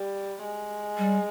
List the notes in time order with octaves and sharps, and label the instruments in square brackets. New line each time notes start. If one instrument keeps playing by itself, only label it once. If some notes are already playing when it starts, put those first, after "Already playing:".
Already playing: [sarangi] G3
G#3
[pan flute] G3